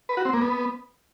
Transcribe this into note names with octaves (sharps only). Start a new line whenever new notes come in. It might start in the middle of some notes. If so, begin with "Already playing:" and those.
B4
F#4
C4
A#3
B3